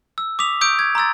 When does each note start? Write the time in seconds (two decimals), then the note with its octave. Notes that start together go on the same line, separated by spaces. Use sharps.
0.18 E6
0.39 D6 D#6 B6 F7
0.61 C#6 D#6 E6 G6 D7
0.79 G#6
0.95 A#5 C6 E6 A6